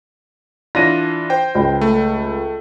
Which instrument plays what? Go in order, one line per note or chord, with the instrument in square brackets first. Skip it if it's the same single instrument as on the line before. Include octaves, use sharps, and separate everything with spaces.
[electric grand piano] E3 D4 F4 [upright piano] A#6 D#7
[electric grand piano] C5 G5
[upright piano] C#2
[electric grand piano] A3